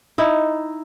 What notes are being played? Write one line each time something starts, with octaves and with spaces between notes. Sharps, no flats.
D#4 E4